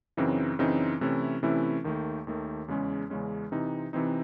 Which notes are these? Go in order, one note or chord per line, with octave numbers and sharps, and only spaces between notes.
F#2 C#3 E3 C4 D#4
F#2 C#3 E3 C4 D#4
C3 E3 A3 C#4 E4
C3 E3 A3 C#4 E4
D#2 D#3 A3
D#2 D#3 A3
E2 C#3 G#3 C#4
E2 C#3 G#3 C#4
C3 E3 C4 D#4
C3 E3 C4 D#4